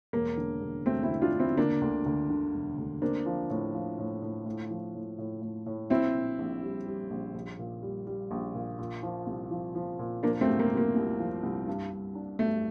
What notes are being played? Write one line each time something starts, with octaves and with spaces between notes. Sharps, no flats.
E1 A#3
D3
E1
E1 A3 C4
C4 E4
D3
D4 F4
D3
C4 E4
D3 A#3 D4
D2
D2
D3
E1
D2
A#3 C4 D4
F3
A2
F3
A2
A2
A2
F3
A2
A2
A2
A2
A#1 C4 E4
A#2
A#1
G3
G3
A#1
A#1
A#2
G3
G3
A#1
A#2
A#2
F3
C2
F3
F3
A#2
F3 A#3 D4
A3 C4
C2
A#3
C2
A#3
C2
F3
C2
G2
G2
D4
G2 A3